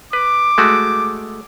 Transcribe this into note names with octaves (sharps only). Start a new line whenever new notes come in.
B4 D6
G#3 A3 F#4